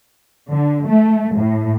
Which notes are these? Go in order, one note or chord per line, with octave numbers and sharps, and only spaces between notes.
D3
A3
A2